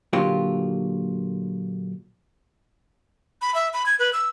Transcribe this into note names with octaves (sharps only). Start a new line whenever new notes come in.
A#2 D3 F#3 A#3 F4 G4
B5
E5
B5
G#6
B4
E6